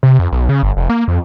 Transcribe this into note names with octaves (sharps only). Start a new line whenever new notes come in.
C3
F2
B1
C#3
G1
F1
A#3
F2